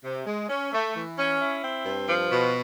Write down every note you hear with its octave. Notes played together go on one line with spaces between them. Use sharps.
C3
G#3
C#4
A3
E3
C#4
E4
C4
G2
F3
B2